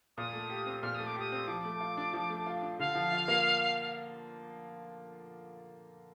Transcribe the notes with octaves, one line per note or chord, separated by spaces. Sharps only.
A#2 D#6
A3
G4
C4
A#2 F6
A3 D#6
D6
G4 D#6
C4
F3 D6
A3
F4
D4
F3
A3
F4
D4
D3 F5
F3
F4
A#3